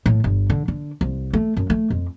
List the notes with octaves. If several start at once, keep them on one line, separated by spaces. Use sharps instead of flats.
A2
G1
D3
D3
C2
A3
F#2
A3
F2